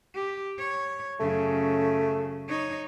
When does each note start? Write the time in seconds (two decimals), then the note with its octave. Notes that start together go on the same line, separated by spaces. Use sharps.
0.15 G4
0.58 C#5
1.20 F#2 C#3 A3
2.49 D#4 C#5